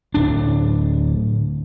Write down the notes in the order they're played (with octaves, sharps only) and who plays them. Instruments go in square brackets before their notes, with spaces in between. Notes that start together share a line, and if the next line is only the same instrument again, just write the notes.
[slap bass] D1 D4